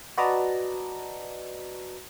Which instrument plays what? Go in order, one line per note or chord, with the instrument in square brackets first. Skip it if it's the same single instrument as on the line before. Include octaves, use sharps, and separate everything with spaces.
[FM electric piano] F#4 B4 D5 D#5 A5 A#5